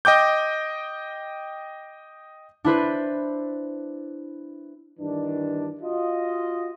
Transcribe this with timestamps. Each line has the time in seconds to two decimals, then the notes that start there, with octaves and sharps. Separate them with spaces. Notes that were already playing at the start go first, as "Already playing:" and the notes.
0.05 D#5 G5 D6 G6
2.65 D4 E4 B4 C5
4.99 G2 D#3 E3 D4
5.82 F4 F#4 D#5